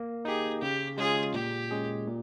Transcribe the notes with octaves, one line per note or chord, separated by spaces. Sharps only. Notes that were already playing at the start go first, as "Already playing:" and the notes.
Already playing: A#3
D#4 G4 G#4
C#3 G4
G#3 C#4 F4 G#4
A#2 G4
G#3 C#4 G#4
A#2